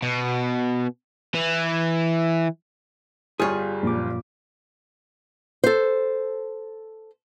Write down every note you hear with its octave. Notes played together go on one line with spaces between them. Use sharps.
B2
E3
G1 G3 F4 G#4 C#5
A#1 F#2 A#2 D6
A4 C5